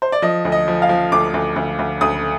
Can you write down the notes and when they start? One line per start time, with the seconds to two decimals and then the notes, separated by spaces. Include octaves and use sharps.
0.02 C5
0.12 D5
0.22 F3 D#5
0.45 D2
0.52 D#5
0.68 F3
0.82 F5
0.89 F3
1.12 D2 D6
1.34 D2
1.56 D2
1.79 D2
2.01 D2 D#6